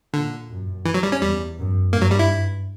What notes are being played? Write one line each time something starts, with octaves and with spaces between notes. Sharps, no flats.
A#2 D3
F#2
E3
F#3
G3
C#4
E2 G3
F#2
G2 A#3
F#3
G3
E4